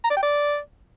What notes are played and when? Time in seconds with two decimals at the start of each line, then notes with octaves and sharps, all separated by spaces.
0.04 A#5
0.10 D5
0.17 G5
0.23 D5